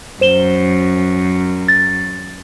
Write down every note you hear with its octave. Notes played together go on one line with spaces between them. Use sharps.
F#2 C5 E7 G7
A6